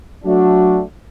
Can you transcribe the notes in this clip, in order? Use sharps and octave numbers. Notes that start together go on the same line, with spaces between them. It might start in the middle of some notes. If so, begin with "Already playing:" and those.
F#3 A3 D4 F#4